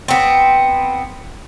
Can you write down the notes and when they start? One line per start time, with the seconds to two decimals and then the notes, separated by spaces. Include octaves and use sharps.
0.08 B3 C4